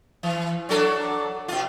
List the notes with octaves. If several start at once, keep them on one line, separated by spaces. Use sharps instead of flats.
E3
F#3 D4 A4
B2 F4